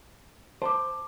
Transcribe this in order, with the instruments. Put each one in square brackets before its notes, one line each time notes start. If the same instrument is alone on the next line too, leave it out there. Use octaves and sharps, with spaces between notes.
[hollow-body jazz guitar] C5 [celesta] A5 D6